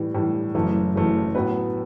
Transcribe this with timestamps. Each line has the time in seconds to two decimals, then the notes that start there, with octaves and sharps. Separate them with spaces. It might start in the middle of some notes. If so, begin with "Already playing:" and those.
Already playing: A2 E3 G3
0.14 A2 E3 G3
0.54 F#1 F#2 E3 A3
0.95 F#1 F#2 E3 A3
1.35 A2 F#3 B3 F#4 B4